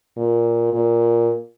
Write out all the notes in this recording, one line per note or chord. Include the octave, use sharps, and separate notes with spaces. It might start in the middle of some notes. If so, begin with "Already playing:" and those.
A#2
A#2